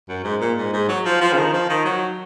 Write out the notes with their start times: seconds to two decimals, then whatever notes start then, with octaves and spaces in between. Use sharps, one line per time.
0.09 F#2
0.24 G#2
0.40 A#2
0.57 G#2
0.73 G#2
0.89 F#3
1.05 F3
1.21 F3
1.33 C#3
1.37 D#3
1.53 F3
1.69 D#3
1.85 F#3